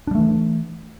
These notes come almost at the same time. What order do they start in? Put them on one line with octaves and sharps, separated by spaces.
D4 G3 A3 E3